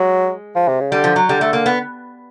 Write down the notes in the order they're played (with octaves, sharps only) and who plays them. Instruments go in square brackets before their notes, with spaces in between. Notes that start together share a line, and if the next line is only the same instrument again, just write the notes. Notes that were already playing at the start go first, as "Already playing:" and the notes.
Already playing: [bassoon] F#3 [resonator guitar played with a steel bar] G#3
[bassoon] F3
C3
C#3
[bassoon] D3 [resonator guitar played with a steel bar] G3
[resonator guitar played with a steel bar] F3
F#3
[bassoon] D3 [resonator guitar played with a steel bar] G3
[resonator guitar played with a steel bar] A3
A#3
B3